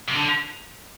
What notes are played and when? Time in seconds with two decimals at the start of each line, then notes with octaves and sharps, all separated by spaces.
0.09 C3
0.15 D3